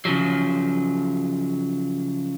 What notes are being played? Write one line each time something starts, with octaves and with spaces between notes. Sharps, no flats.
C#3 F3 F#3